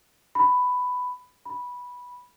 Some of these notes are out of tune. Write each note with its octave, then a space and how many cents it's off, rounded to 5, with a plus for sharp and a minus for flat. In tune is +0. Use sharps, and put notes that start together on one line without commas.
B5 +10
B5 -10